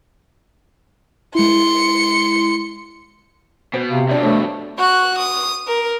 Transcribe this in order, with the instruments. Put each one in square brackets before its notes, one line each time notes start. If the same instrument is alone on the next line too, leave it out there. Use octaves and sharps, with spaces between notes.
[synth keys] G#3 E4 [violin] C6 C#7
[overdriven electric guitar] B2 [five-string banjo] B3 B4 C5
[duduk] C3 [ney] F5
[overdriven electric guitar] G2 B2 [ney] D4 [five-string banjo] F4 D5 E5
[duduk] A3 [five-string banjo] C5 C#5
[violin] F#4 F#6
D#6
A#4